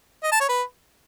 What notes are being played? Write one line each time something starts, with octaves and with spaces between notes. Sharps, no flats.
D#5
A5
C#5
B4